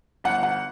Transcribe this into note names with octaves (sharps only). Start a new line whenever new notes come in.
G1 F#5
F#5